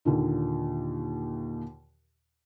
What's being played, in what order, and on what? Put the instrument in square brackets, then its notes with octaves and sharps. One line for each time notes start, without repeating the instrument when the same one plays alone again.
[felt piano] D#2 A#2 D3